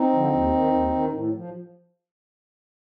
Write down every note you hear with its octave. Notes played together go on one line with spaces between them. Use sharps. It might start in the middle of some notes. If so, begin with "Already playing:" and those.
Already playing: C4 D#4
D3 F3
D#2
D#3
D#2
D#3
A2
F3